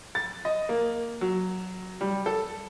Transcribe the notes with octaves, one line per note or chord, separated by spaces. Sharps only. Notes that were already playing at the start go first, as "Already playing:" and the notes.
A6
D#5
A#3
F#3
G3
A4